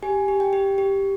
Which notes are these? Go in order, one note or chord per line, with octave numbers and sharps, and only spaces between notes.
G4 G#5
G4
G5
G4
G4